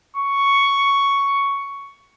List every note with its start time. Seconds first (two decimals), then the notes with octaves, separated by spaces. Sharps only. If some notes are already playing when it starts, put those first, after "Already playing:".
0.16 C#6